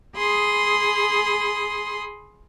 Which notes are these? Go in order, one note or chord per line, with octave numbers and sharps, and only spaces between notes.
G#4 B5 C6 D#6